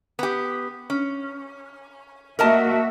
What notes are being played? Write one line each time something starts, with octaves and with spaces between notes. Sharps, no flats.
B3 G4
C#4
A#3 F#4 A#4 D#5 E5 A5